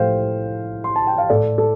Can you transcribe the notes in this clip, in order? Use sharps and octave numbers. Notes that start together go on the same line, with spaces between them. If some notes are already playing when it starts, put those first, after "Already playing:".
Already playing: A2 F3 A3 C5 F5 G5
C6
A5
G5
F5
A2 A3 A4 D5
A4